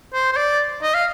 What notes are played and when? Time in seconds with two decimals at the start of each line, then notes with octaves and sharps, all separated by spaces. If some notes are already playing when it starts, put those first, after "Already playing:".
0.14 C5
0.33 C5
0.37 D5
0.83 D#5
0.95 F5